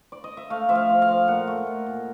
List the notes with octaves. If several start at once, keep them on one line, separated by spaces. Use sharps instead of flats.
D5
D#5
E5
A3 F5
F3 E5
F5
F3
F5
F3
A#2 F#5
A3
A#2
A#2